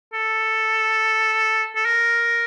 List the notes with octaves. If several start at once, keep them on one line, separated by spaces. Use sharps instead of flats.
A4
A4
A#4